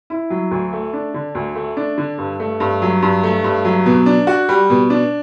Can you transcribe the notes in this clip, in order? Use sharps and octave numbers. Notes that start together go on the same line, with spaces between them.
E4
F#3
D2
A3
D4
D3
D2
A3
D4
D3
G2
A3
G2
F#3
G2
A3
G2
F#3
B2
D4
F#4
G3
B2
D4